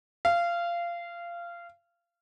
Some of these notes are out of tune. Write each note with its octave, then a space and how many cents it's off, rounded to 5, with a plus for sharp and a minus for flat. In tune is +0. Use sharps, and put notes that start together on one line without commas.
F5 -20